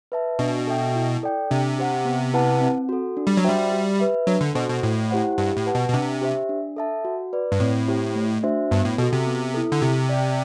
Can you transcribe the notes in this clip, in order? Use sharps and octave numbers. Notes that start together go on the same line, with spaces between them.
B4 E5 A5
B2 D4
A4 E5 G5
E4
A4 D5 G5
C3 D4
G4 C5 F#5
B3
E4 B4 F#5 A5
C4
F#4 A4
D4
G3
F#3
G3 F#4 C5 E5 G5
G4
B4 E5
F#3 D4
D3
B2 F#4 A4 C5
B2
A2 A3
E4 G4 C5 F#5
G2 G4
A2
B4 F#5 A5
B2
B2
C3 D4
G4 C5 E5
D4
A4 E5 A5
F#4
B4 D5
G2
A2 C4
E4 G4 C5
A3
D4 F#4 C5 E5
G2 B3
A2
B2 F#4 A4
C3
B3
E4 A4
D3
C3 G4
D5 G5